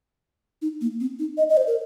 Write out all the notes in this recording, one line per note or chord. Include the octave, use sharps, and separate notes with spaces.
D#4
A#3
C4
D#4
D#5
D#5
C5
A#4